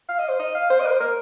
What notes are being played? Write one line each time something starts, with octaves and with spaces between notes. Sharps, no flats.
F5
D#5
C5
D#5
F5
C5
D#5
A#4
C5
A#4